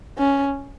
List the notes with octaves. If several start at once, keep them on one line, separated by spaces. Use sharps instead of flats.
C#4